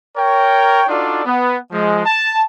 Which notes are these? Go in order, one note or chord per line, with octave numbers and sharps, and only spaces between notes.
A#4 C#5 G5
D4 D#4 F4 F#4 A4 D5
B3
F3 G#3
A5